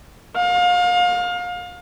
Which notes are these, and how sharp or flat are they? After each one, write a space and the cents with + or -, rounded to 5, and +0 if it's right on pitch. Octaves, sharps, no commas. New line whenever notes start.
F5 +30